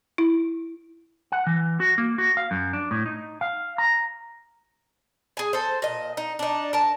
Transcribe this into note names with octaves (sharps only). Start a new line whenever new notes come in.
E4
F#5
E3
F#4
A#3
F#4
F5
F#2
D4
A2
D#4
F5
A#5
G#4 G#5
A4 C5
A#2 D#5
D#4
D4 D#4
A#4 A5